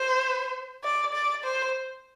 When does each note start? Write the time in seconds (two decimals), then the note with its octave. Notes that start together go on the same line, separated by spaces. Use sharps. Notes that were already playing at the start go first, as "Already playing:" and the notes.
Already playing: C5
0.84 D5
1.14 D5
1.44 C5